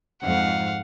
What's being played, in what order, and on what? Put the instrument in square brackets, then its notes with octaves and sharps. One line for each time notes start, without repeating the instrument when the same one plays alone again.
[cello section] F2 G#2 [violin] F5 F#5